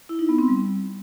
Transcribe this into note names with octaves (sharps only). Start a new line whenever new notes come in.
E4
D#4
B3
C4
G3